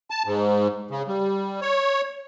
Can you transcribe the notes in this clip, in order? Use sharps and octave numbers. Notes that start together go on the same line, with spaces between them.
A5
G#2
C#3
G3
C#5